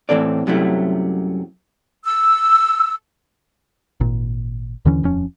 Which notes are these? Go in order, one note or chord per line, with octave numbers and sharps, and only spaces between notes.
A2 C#3 E3 C4 A4 D5
F#2 C3 F#3 G3 A3 E4
E6
G#1 A#2
D#2 D3 E3 C#4
D#1 F2 F3 C#4